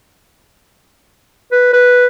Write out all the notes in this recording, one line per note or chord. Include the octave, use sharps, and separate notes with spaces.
B4
B4